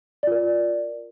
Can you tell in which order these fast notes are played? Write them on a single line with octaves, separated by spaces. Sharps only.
D5 F4 A#4